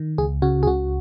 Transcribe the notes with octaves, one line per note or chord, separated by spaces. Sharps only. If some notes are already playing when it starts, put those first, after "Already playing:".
Already playing: D#3
C#2 G#4
C#3 F#4
G#4
C#2 F#4